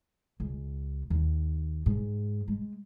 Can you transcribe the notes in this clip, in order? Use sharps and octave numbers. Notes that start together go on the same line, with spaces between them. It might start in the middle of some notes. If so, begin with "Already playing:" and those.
C#2
D#2
G#2
G#3